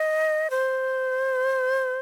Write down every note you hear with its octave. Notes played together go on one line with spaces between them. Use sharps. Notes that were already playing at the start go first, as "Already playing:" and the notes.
Already playing: D#5
C5